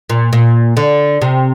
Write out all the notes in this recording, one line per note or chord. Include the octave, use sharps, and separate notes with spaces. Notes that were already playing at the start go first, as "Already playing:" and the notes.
A#2
A#2
D3
C3